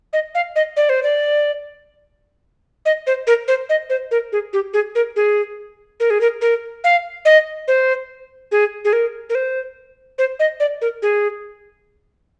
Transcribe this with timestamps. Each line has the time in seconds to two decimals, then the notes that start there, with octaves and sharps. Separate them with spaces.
0.13 D#5
0.35 F5
0.56 D#5
0.77 D5
0.89 C5
1.03 D5
2.86 D#5
3.07 C5
3.27 A#4
3.48 C5
3.69 D#5
3.90 C5
4.11 A#4
4.32 G#4
4.53 G4
4.73 G#4
4.95 A#4
5.16 G#4
6.00 A#4
6.10 G#4
6.21 A#4
6.41 A#4
6.84 F5
7.25 D#5
7.68 C5
8.52 G#4
8.85 G#4
8.93 A#4
9.30 A#4
9.35 C5
10.18 C5
10.39 D#5
10.60 D5
10.81 A#4
11.02 G#4